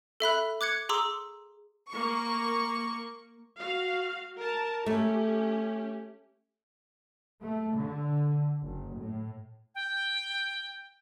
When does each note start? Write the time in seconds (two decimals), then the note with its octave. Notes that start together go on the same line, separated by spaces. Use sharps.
0.20 A4 E5 B5 F#6
0.61 D6 F#6 G#6 C#7
0.89 G#4 A#5 C6 D6 E6
1.89 A#3 C#6
3.58 F#4 F5
4.38 A#4 A5
4.86 A3 C#4 G4
7.42 A3
7.76 D3
8.62 F#1
8.96 A2
9.75 G5